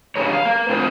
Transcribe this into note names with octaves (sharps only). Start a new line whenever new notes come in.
A#3 D4 G4 G#4 A#4 C#5
F5
A#3
C4 D4 F4 G#4 B4 C5